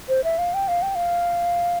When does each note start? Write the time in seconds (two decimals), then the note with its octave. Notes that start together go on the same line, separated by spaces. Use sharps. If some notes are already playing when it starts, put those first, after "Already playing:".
0.09 C5
0.24 E5
0.38 F5
0.54 G5
0.68 F5
0.82 G5
0.95 F5